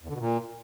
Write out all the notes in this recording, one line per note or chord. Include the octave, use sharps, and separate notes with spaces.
E2
D3
B2
A#2